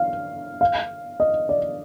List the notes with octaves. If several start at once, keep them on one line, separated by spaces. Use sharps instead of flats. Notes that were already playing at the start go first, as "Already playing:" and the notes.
Already playing: F5
F5
D#5
D5